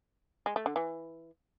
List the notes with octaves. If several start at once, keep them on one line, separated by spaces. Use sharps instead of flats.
G#3
A3
D3
E3